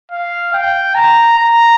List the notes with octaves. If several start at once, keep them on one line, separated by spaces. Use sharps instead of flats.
F5
G5
A#5
A#5